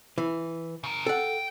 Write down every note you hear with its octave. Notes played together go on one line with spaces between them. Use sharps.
E3
C#3 A#4
A4 F#5 G5